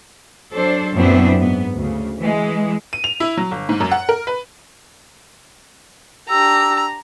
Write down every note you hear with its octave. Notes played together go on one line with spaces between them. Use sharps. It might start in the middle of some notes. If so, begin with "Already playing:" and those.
F#3 D4 A4 C5
F#2 A#2 B3 C4 D4 E4
G#2 B3
D2 C#3
E3 G#3
D#7
F7
E4
F#3
G1
G#2
F#2
F#5
A#4
B4
D4 G4 A#5 E6